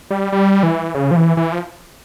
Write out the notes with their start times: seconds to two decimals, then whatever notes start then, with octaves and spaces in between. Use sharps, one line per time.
0.11 G3
0.32 G3
0.63 E3
0.95 C#3
1.11 F3
1.16 E3
1.37 E3
1.52 F3